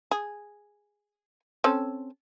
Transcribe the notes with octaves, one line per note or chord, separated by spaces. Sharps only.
G#4
C4 C#4 A4